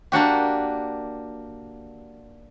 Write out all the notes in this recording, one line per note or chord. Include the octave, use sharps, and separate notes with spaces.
A#3 D4 F#4 G4